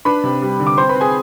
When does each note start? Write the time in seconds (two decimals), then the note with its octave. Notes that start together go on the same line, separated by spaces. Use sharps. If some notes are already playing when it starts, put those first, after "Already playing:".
0.05 D4 B4 B5
0.24 C3
0.42 G3
0.60 D3
0.67 D6
0.77 C4 C5 C6
0.89 B4 B5
0.95 C4
1.01 G#4 G#5